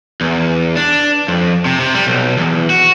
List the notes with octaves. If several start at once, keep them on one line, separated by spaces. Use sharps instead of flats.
E2
D4
F2
C3
C3
G3
B1
E2
F#4